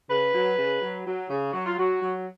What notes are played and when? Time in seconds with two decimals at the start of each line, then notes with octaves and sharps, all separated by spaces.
0.09 C#3 B4
0.33 F#3
0.57 C#3
0.82 F#3
1.06 F#3
1.29 C#3
1.53 F#3 F#4
1.66 F4
1.78 F#3 F#4
2.02 F#3